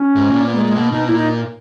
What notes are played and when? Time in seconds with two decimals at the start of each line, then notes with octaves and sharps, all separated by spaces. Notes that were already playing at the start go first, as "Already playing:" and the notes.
Already playing: C#4
0.15 G#2
0.30 A#2
0.46 B3
0.55 G#3
0.66 G#3
0.76 B2 A#3
0.92 B2 D#4
1.07 A#2 E4
1.17 D#4